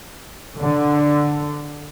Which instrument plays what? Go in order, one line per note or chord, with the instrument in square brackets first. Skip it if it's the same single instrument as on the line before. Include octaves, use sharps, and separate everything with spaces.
[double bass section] D3